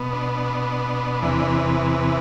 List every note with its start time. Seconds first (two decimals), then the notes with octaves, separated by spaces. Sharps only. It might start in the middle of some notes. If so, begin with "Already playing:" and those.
Already playing: B2 B3
0.13 D4
0.34 D4
1.23 E2 C3 E3 B3